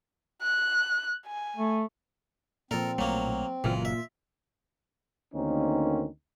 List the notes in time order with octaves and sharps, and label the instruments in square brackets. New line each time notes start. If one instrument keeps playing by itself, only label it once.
[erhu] F#6
G#5
[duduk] A3
[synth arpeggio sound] A#2 F3 [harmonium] C4 [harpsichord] A4 A#4
[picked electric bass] B1 A3 [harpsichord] F#3 A#3
[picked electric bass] G1 C#3 F#3 [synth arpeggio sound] A#2 F4 [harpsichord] E3
[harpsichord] E5
[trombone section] D2 D#3 A#3 C4 C#4 D#4